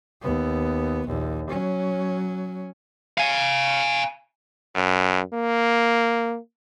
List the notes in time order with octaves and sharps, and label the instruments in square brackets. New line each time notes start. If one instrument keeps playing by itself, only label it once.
[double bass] D#2 B3
A#1 D#2
F#3 C#4
[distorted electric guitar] F5 G#5
[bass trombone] F#2
A#3